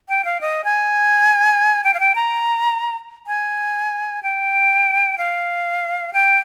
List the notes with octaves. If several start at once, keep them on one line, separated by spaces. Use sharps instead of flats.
G5
F5
D#5
G#5
G5
F5
G5
A#5
G#5
G5
F5
G5